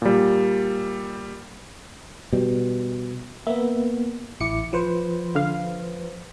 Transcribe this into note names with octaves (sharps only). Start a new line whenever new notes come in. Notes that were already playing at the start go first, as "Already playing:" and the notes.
A#2 G3
B2 G3
A#3 B3 E5
A1 E4 D6 C#7
F3 B4 C5
D3 F5